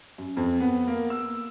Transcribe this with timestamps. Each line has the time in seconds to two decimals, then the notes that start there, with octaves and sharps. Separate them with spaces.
0.18 F#2
0.37 F2
0.60 B3
0.87 A#3
1.10 E6